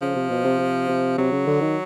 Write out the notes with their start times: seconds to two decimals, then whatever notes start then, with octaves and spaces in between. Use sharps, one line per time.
0.02 C#3 F3
0.16 C3
0.30 B2
0.45 C3
0.60 C3
0.89 C3
1.18 C3 F#3
1.32 C#3
1.47 D3
1.61 D#3